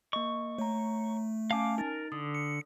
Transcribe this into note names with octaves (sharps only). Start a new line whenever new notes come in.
A#3 D#5 C#6
A3 C#5 A#5
C#4 F5 G#5 A5 D6
D#4 A#4 A6
D3 D#6
C#7